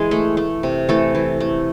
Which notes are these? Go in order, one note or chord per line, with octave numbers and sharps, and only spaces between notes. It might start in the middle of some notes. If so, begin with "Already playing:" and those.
Already playing: E3 G#3 G#4
A3
A3
C3
E3 A3 A4
E3
A3